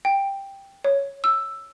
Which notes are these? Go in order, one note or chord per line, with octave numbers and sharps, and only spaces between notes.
G5
C#5
E6